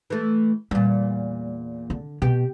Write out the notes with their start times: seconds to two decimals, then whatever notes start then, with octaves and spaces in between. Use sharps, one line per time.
0.10 E3 A3
0.71 E2 A#2 G3
1.90 D3
2.22 B2 G4